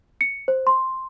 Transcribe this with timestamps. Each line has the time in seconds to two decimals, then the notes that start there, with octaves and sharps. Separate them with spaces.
0.21 C#7
0.48 C5
0.67 C6